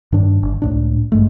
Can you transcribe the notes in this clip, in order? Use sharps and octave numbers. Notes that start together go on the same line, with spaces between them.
G2 D#3 D4
G1
C#2 A2 D4
A1 G2 G#3 A3